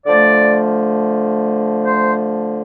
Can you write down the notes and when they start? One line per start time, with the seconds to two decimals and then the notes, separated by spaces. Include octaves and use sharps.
0.07 D3 F3 A3 D5
1.85 C5